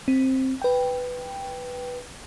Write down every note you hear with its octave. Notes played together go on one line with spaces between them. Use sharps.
C4
B4 G5